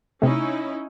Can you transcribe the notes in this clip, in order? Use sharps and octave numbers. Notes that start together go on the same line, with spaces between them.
C3 A3 C#4 D#4 E4